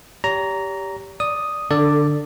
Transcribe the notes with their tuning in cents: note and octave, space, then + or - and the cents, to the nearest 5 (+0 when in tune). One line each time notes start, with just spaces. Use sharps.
G4 +0 C#5 +45 A#5 +0
D5 +0 D#6 +0
D3 +0 A4 +30 D5 +0